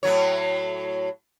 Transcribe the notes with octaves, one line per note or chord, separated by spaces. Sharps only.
A2 F#3 C#5